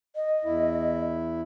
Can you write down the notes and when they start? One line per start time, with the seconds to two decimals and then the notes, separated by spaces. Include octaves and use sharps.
0.15 D#5
0.45 E2 E4